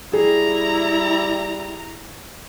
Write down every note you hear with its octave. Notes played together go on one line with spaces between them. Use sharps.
G3 E4 G#4 A#5